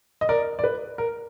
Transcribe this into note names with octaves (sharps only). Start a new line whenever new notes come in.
D#5
A#4 D5
D5
B4
A#4